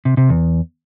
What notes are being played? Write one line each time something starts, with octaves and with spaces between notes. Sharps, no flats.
C3
C3
E2